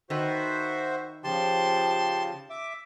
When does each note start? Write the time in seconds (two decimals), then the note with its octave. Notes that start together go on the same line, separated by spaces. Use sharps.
0.10 D#3 F#4 B4 C5 E5
1.24 C#3 F3 G4 A5 C6
2.50 E5 D6